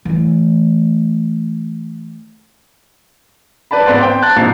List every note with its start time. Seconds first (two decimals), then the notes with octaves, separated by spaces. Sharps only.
0.05 E3 A3
3.71 B4 D5 A5 B5
3.86 G#1 B3 D5 C6 A6
3.99 C4 C5 G5
4.22 A5 F#6 A6
4.36 A#1 G#2 C3 C7